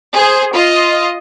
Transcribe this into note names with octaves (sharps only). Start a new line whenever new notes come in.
G#4 C5
F4 D#5